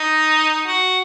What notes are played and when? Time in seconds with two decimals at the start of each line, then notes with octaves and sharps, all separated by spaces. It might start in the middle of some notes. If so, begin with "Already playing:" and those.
Already playing: D#4
0.67 F#4